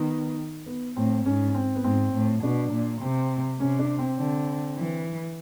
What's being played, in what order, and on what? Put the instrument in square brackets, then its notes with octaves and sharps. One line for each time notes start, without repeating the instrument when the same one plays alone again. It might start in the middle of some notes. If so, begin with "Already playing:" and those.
Already playing: [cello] D#3 [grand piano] B3
[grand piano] B3
[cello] A2 [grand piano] C4
[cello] G#2 [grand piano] C#4
[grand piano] C#4
C4
B3
[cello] G#2 [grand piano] C4
[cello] A2
[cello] B2 [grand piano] D4
[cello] A#2
[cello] C3 [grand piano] C4
[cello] C3 [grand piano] C#4
[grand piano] D4
C4
[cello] D3
E3